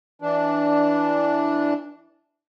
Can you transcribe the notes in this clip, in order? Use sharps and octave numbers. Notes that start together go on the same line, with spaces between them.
E3 D4